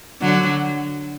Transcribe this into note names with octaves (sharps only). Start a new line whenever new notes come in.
D3 F#3